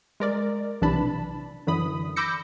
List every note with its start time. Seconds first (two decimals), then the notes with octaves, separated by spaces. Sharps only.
0.20 G#3 A#4 D5
0.81 B1 C3 E3 D4 A5 B5
1.67 F#2 D3 E3 B5 D#6
2.16 B5 D6 E6 G6 A#6 C#7